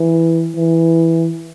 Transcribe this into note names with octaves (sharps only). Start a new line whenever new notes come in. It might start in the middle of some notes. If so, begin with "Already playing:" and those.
Already playing: E3
E3